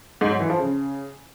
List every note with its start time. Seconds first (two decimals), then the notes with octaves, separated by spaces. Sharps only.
0.21 G#2
0.31 F#3
0.40 E3
0.50 F3
0.59 C#3